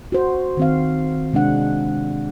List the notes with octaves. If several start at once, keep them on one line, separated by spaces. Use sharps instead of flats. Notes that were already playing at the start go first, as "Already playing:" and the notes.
F#4 C5
D#3 C4 F5
C3 G#3 D4 F#5